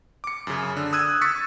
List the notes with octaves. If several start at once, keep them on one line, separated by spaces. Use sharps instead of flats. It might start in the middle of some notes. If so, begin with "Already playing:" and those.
D6 C#7
F#2 C#3
D3
D#6 E6 F#6 G#6 D#7
C#6 E6 G#6 A6 B6 C#7